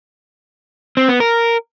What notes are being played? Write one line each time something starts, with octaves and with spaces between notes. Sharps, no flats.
C4
B3
A#4